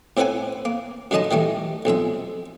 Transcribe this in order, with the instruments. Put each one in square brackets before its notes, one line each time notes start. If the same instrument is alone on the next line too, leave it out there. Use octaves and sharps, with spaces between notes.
[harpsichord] A2 C4 E4 B4 F#5 G#5
A#3
F#2 D3 G#3 D#4 D#5 A5
D#3 E3 G3 A3
B1 F2 G#3 E5